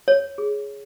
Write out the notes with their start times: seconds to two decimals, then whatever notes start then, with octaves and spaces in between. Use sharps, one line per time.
0.08 C#5
0.38 G#4